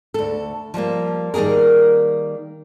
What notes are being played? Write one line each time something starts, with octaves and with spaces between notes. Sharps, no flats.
D2 A4
F3 G3 G#3 A#3
D#3 G3 A#3 G#4 A#4